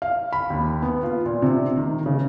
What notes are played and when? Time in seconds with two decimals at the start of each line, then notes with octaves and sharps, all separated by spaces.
0.02 F5
0.33 B5
0.50 D#2
0.82 B3
1.03 F4
1.26 A#2
1.42 C3
1.77 D#3
2.06 C#3